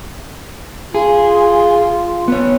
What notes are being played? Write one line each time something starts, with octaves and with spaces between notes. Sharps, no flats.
F4 G#4
B3 C#5